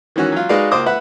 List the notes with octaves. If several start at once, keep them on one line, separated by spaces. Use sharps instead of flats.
D#3 E3 C#4 F#4
F#3 F4
G#3 D#4 F#4 B4 D5 F5
C#2 A#3 C5 D6 D#6
B4 E5 F#5